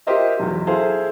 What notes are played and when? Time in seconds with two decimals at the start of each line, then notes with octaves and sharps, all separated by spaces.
0.07 F4 G4 A#4 C5 D#5 E5
0.40 B1 E2
0.67 E4 G#4 A4 C5 F5